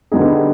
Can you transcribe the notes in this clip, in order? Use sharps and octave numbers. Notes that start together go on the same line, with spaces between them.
D3 G3 B3 D#4 G#4